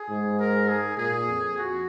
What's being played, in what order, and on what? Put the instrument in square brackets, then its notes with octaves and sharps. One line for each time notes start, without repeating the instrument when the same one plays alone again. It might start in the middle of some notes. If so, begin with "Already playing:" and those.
Already playing: [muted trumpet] G#4
[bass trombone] G#2
[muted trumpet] A#4
G#4
[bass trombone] A#2 [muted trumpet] G#4
[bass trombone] F2
[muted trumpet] F#4